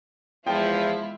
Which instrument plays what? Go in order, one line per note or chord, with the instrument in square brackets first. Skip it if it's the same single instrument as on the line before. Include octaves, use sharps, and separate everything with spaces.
[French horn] E2 [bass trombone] F3 [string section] G#3 E4 F4 [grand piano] G5